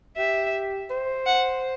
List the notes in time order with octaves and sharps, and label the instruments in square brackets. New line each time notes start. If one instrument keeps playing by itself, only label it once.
[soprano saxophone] G4 [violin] E5
[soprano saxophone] C5
[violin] F#5